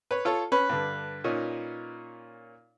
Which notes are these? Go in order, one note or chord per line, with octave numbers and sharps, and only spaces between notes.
B4 C#5
F4 A4 C#5
C#4 B4
G2 D3
A#2 C#4 D#4